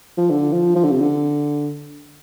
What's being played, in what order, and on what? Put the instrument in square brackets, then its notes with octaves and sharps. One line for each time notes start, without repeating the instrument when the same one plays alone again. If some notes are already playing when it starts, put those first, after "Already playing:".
[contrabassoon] F3
D3
F3
F3
D3
C3
D3